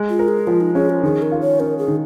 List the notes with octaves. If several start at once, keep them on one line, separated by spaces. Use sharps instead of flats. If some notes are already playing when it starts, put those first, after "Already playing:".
Already playing: G#3
F4
A#4
G#4
F3 F4
D#4
C#4 G#4
F4
D#3 G#4
A#4
F4
C#5
C#4 A#4
G#4
D#3